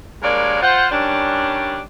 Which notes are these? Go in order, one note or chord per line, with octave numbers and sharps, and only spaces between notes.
G2 G#3 A#3 A#4 C#5 D5
F4 C5 F#5
D#3 G3 C#4 D4